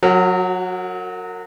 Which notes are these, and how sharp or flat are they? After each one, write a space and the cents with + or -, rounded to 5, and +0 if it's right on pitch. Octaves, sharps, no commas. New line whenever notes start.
F#3 -20 F#4 +20 A#4 -35